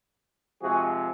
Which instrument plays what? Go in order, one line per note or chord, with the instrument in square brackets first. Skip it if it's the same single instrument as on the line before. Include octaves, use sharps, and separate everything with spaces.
[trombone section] C3 F3 G#3 F#4 G#4